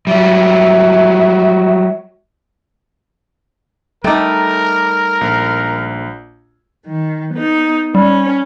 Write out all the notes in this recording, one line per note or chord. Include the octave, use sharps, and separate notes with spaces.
F#3 G3 E5
G3 A3 D#4 A#4 G5 D6
A#1
D#3
B3 D#4
G3 C#4